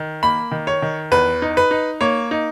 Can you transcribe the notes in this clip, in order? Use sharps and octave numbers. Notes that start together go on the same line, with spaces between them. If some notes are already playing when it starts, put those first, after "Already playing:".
Already playing: D#3
A#3 B5
D#3
C#5
D#3
E2 B4
D#4
B4
D#4
A#3 C#5
D#4